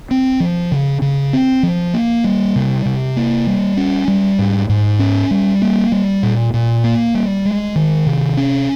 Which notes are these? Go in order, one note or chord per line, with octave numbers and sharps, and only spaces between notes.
C4
F3
C#3
C#3
C4
F3
A#3
G3
C3
C3
A#3
G3
C#4
G3
G#2
G#2
C#4
G3
A#3
G3
A#2
A#2
A#3
G3
G#3
D#3
C3
C#4